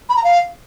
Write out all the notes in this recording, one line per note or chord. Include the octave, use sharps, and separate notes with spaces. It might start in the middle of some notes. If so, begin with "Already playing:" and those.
B5
A#5
F5